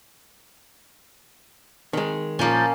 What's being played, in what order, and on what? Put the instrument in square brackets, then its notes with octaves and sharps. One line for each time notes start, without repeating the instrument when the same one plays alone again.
[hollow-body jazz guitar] D#3 G#3
[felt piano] A#2 [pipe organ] F3 G6 A6 [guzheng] A#3 C#4